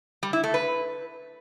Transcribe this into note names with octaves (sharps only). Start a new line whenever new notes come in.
G3
E4
A3
B4